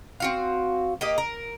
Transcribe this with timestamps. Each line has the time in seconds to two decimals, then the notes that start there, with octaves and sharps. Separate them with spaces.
0.20 C4 F#4 F5
1.01 A#3 G4 D#5
1.18 A#4